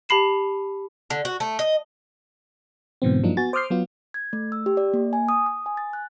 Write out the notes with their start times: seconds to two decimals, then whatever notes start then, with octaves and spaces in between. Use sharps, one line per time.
0.09 G4 A5 B5 C7 E7
1.10 D3
1.25 F#4
1.40 A3
1.59 D#5
3.02 G#2 B2 D3 E3 B3 C4
3.23 G2 F3 F#3 A#3 D4 D#4
3.37 B3 F#4 G#5 A6
3.53 C5 D6 D#6 F6 G6 C7
3.70 F#3 B3 F4
4.14 G#6
4.33 A3
4.52 E6
4.66 G4
4.77 D5
4.94 A#3
5.13 G#5
5.29 D#6
5.46 D#6
5.66 G#5
5.77 A6
5.93 F#6